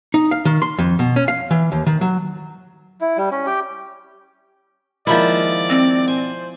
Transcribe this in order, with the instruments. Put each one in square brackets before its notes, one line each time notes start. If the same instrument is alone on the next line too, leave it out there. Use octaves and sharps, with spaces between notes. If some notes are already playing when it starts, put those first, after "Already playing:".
[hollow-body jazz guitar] D#4
F5
D#3
C6
F2
B2
C#4
F5
E3
D#2
D#3
F#3
[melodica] E4
G3
C#4
G4
[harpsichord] D#3 G#3 A#3 [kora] F3 E4 [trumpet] D5
[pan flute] C4
[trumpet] C5 [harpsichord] G#5